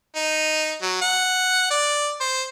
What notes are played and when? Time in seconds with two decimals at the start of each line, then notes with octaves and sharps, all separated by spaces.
0.15 D#4
0.82 F#3
1.01 F#5
1.71 D5
2.20 C5